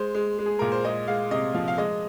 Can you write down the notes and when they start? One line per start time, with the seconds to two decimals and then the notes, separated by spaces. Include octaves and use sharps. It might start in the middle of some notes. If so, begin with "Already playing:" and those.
Already playing: G#3 C5
0.14 G#3
0.38 G#3
0.46 G#4
0.59 A#2 A#4
0.72 C5
0.85 G#3 D#5
1.08 G#3 F5
1.31 C3 D#5
1.54 F3 F5
1.68 F5
1.78 G#3 D#5